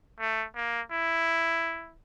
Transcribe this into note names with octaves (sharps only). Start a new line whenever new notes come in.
A3
A#3
E4